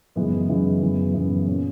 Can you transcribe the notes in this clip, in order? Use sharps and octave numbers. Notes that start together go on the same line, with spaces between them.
F#2 C#3 E3 G#3 B3
F#2 C#3 E3 G#3 B3
F#2 C#3 E3 B3
F#2 C#3 E3 B3
A#2 A#3 C#4